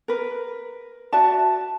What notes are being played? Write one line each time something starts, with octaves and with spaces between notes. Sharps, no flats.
A#4 B4
F#4 D5 E5 A5